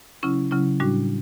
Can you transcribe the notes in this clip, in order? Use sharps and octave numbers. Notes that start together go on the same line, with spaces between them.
C#3 F#3 C#4 E4
C#3 F#3 C#4 E4
A2 G3 D4 F#4